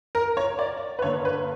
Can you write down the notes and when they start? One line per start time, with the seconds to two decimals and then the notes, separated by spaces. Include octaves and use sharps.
0.15 A#4
0.37 C#5
0.59 D5
0.99 B4
1.02 G2 D3 A#3 C#5
1.25 B4